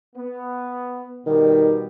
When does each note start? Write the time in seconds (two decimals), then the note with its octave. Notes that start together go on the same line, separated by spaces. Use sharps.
0.16 B3
1.26 B2 D#3 G3